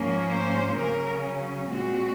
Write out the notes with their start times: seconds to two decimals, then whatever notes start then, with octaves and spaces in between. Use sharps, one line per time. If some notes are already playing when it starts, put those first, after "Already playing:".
Already playing: G#2 F3 A#3 C#4
0.29 C5
0.75 C#3 F#3 C#4 A#4
1.69 A#2 G#3 C4 F#4